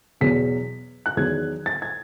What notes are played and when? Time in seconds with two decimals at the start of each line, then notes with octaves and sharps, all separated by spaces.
0.21 E2 B2 F#3 B6
1.06 F#6
1.17 E2 D#3 F#3 G#6
1.66 A6
1.82 G#6